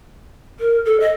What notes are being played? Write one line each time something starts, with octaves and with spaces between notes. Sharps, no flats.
A#4
A4
D#5